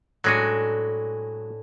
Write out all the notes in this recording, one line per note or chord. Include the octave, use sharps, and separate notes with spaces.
A2 F#3 G#3 D4 F#4 G#5